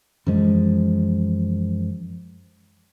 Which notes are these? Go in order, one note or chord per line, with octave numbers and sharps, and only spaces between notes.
F#2 E3 F3 G#3